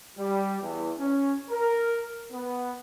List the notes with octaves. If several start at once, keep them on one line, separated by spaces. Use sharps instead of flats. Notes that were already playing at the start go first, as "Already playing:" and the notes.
G3
E2
C#4
A#4
B3